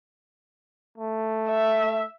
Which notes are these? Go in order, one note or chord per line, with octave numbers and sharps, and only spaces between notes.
A3
E5